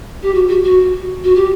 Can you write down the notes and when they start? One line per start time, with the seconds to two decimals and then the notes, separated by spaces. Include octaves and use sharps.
0.22 G4
0.33 F#4
0.48 F#4
0.64 F#4
1.24 F#4
1.35 G4